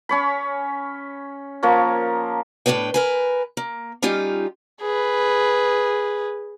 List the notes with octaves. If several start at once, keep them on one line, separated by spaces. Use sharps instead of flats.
C#4 C#5 B5
F3 A#3 A#4 C#5
A2 C#4 D4 B4 G5
A#4 B4 G#5
A#3
G3 C#4 D#4 F4 G4
G#4 B4